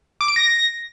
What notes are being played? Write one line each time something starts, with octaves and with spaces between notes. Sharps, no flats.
D6
D7
A#6